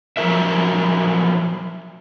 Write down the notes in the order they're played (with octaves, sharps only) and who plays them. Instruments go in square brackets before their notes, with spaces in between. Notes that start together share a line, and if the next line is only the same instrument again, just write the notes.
[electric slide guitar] F3 F#3 A#4 E5